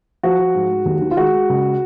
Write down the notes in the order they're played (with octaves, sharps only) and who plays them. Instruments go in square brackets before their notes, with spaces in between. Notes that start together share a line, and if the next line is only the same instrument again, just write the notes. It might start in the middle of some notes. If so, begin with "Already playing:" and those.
[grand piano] F3 F#4
F3
G#2
G#3
D#2
D#3
F4
G#3 F#4
G#3
C#2